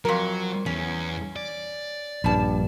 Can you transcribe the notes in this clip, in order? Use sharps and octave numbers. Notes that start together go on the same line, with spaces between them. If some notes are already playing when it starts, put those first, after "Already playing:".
F2 F#3 A#4
E2 C#4
D5
A#1 G2 G3 A5